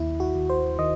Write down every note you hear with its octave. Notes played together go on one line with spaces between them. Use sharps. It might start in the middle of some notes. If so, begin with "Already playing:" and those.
Already playing: D#2 E4
F#4
D#2
C5
D#3 D#5